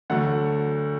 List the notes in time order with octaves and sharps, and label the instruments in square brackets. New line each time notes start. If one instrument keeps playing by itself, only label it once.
[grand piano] D2 D3 F#3 A3 F#5